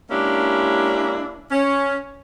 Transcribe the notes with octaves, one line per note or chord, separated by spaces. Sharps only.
G#3 A#3 C#4 D4 E4 G4
C#4